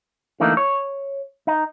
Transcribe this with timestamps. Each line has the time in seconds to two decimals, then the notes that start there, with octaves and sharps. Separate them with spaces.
0.40 D3 E3 A3 A#3 D#4
0.57 C#5
1.47 D#4